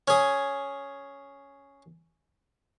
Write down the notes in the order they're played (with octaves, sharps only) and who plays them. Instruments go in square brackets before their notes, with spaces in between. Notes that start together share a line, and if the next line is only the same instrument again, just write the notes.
[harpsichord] C#4 G#4